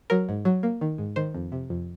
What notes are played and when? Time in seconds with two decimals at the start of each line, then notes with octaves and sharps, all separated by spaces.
0.10 F#3 A#4
0.29 G#2
0.45 F#3
0.63 A#3
0.81 D#3
0.98 G#2
1.16 D#3 C5
1.34 F2
1.52 C3
1.70 F2